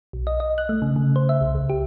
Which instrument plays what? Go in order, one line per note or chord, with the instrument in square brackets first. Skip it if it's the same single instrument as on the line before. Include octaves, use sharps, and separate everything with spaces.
[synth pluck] B1
D#5
D#5
F#6
A3
C#3
C#3
C5
E5
C2
C#2
G4